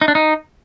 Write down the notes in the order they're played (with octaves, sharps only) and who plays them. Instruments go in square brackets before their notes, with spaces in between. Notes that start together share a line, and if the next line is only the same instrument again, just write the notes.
[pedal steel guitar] D#4
D4
D#4